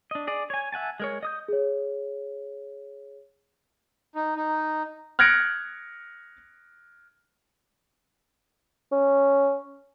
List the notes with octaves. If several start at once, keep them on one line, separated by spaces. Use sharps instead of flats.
D4 D#5
G#4 D5
C#5 G#5
E5 F#5 G#5 A5
G#3 A#4 C#5
D#5 D#6 G6
G#4 C#5
D#4
D#4
F6 F#6 G#6 A#6 C#7 D7
C#4